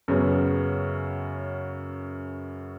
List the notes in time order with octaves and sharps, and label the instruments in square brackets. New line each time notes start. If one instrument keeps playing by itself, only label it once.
[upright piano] F#2 C#3 B3 C#4